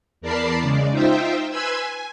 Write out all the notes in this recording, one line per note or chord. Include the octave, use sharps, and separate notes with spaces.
E2 A#4 D5 A5 B5 C7
C#3 G#3 D5
D#4 F4 C5 E5 G5
B4 G#5 B5 C6 E6 G#6
G#5